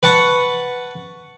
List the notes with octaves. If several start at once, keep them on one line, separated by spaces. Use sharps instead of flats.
B4 F#5 A5 C#6